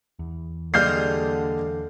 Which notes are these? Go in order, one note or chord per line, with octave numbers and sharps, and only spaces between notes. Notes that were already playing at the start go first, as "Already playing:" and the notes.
E2
D3 G3 G#3 A#3 F6 G6 C7